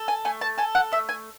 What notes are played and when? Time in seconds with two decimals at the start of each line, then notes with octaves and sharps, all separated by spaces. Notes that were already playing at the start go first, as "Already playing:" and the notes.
Already playing: A4
0.08 G#5
0.25 A3 G#5
0.41 A5
0.58 A4 G#5
0.75 F#5
0.92 A3 E5
1.09 G#5